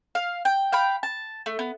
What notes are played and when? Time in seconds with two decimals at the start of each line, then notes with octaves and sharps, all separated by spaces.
0.15 F5
0.45 G5
0.72 F5 G5 B5
1.03 A5
1.46 A3
1.59 B3